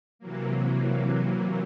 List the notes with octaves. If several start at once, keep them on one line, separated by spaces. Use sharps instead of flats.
C3 E3 F#3 A#3